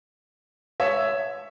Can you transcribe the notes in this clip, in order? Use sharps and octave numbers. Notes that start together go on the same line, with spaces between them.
C#5 E5